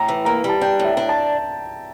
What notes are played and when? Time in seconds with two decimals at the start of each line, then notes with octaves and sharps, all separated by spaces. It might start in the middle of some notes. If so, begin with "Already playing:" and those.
Already playing: A2 A#5
0.08 E3
0.25 A#3 A#5
0.44 G3
0.49 A5
0.61 D4 G5
0.79 A2
0.85 E5
0.97 D4
1.09 A5